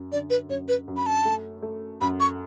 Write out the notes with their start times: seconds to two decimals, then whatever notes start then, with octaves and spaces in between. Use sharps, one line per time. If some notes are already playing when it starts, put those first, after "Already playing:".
Already playing: F#2
0.12 D3 D5
0.30 B4
0.49 F#2 C#5
0.68 B4
0.88 F#2
0.97 B5
1.06 A5
1.25 A3
1.62 A3
2.01 F#2 B5
2.20 C#6